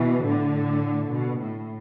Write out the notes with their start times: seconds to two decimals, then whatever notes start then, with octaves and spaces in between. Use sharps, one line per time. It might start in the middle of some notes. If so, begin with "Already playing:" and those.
Already playing: B2 E3
0.23 A2 D3
1.11 B2
1.39 A2